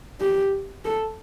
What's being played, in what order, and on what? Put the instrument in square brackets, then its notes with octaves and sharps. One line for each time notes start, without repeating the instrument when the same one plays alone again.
[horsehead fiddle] G4
A4